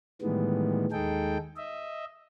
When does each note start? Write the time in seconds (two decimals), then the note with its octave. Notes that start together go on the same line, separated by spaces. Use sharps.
0.22 A2 D#3 E3 G3 G#3 B3
0.92 D#2 G#3 D#4 G#4 A4 G5
1.57 D#5 E5